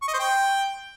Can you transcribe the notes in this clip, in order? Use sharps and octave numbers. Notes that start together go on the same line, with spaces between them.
C#6
D#5
C5
G5